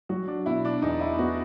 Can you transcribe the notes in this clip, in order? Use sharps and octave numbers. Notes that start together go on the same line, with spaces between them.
F#3 F#4
D4
B2 E4
D4
E2 D#4
E4
B3 F#4